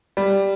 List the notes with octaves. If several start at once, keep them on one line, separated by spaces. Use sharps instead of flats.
G3